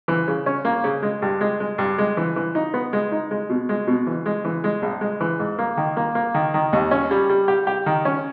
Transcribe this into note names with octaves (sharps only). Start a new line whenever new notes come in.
E3
C#3
C#4
A#3
C#3
G#3
G2
G#3
G#3
G2
G#3
E3
E3
D#4
B3
G#3
D#4
G#3
B2
G#3
B2
E3
G#3
E3
G#3
A#1
G#3
E3
G#2
A#3
D#3
A#3
A#3
D#3
D#3
D#2
C#4
G3
G3
G4
G4
D#3
C#4